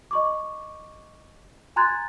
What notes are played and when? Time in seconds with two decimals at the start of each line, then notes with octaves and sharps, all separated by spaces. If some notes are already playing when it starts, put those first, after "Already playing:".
0.11 D#5 C#6 D6
1.76 G#5 A#5 C6 F#6 G#6 A6